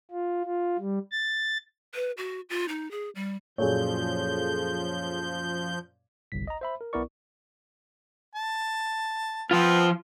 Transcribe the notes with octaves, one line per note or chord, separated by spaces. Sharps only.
F4
F4
G3
A6
B4
F#4
F4
D#4
G#4
G3
F#2 A#2 F3 G#4 A4 C#5 G6
G1 C2 B6
D#5 A#5
C5 E5 B5
A#4
B1 B3 E4 A#4 D5 C#6
A5
F3 B3 C4 F4